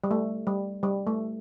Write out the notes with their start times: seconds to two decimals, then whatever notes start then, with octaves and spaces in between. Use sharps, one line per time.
0.04 G3
0.11 A3
0.47 G3
0.83 G3
1.07 A3